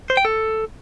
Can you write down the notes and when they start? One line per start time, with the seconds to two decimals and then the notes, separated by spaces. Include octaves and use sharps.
0.10 C5
0.17 G5
0.25 A4